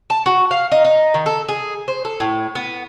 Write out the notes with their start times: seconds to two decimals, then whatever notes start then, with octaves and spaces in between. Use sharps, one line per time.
0.10 A5
0.26 F#4
0.51 F5
0.71 D#4
0.85 D#4
1.14 D#3
1.26 A4
1.48 G#4
1.88 C5
2.05 A4
2.20 A2
2.55 B3